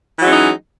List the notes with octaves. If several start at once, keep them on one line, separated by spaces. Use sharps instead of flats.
E3 F#3 G#3 C#4 D#4